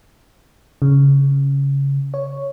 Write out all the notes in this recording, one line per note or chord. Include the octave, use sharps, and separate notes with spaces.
C#3
C#5